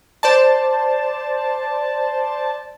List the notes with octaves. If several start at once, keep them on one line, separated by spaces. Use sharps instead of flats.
C5 D5 A5